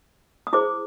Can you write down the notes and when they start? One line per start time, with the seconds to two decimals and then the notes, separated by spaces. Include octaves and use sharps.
0.47 D#6
0.53 E4 G#4 C5 D6